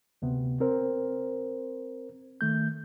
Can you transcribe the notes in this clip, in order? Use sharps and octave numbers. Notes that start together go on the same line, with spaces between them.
D2 C3 B3
C4 A#4 C5
D#3 A3 G6